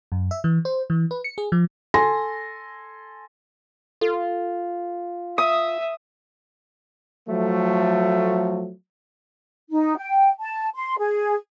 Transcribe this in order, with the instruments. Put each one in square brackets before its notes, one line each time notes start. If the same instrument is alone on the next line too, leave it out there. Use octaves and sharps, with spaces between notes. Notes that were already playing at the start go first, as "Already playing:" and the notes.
[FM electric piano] F#2
E5
E3
C5
E3
B4
C#7
G#4
F3
[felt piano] A4 G#5 C6 A#6
[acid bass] F4 [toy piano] A4
[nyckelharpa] E5 [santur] D#6
[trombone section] F3 F#3 A3
[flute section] D#4
G5
A5
C6
G#4